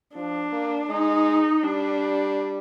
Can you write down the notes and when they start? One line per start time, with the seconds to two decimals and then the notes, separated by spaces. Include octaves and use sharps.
0.15 F3 D4
0.52 A#3
0.89 G#3 D#4
1.64 G3 D4